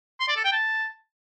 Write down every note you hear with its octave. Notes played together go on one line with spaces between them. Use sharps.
C6
D5
A4
G5
A5